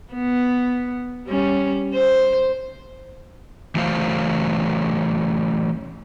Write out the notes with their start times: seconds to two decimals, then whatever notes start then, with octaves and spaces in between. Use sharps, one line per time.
0.14 B3
1.27 G3 C#4
1.94 C5
3.75 E3 F#3 A3 C5 F5